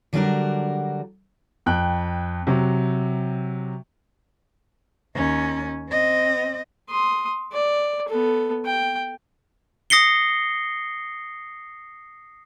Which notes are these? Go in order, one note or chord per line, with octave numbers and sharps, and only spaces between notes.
D3 F#3 G3 D4 F#4 A#4
F2 G5 F#6
C3 F#3
D#2 C#4
C4 D#5
C6 D#6
D5
B3 A4
G5
D#6 A#6 C7 C#7 G7